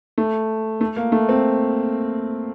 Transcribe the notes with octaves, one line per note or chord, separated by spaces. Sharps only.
A3
A3
A#3
A3
C4